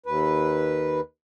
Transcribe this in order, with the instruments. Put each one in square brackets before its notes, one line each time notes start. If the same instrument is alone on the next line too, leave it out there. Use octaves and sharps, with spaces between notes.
[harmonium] D#2 B4